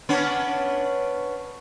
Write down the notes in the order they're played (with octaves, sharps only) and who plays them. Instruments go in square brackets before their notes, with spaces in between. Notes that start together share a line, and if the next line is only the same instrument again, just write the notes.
[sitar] B3 C#4 D4